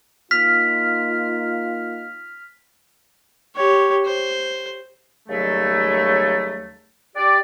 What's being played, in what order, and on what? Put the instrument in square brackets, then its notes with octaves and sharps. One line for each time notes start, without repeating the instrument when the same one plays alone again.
[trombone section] A#3 D#4 F4 [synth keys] F6 [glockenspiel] B6
[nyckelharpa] G4 C#5
C5
[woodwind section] D#2 C#3 F#3 G3 A3
G4 D5